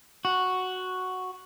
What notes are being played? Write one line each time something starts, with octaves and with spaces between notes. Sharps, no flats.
F#4